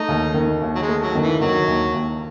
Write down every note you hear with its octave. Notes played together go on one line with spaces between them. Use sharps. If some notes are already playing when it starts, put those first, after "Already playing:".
Already playing: A3 D#4
D#2
D#3
D#2
F#3
G#3
A3
F#3
D#3
E3
D#3 F#3
D#2
D#2